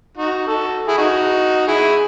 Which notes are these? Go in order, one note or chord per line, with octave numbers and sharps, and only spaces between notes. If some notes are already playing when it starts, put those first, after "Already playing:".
D#4 F#4
F#4 A4
E4 G#4
D#4 F#4
E4 G#4